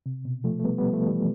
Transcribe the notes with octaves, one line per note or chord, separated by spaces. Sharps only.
C3
B2
F3 A3
A3
G3 B3
G3 B3
F3 A3
E3 G3